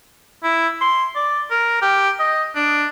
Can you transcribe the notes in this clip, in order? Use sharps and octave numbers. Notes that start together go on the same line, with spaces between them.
E4
C6
D5
A#4
G4
D#5
D4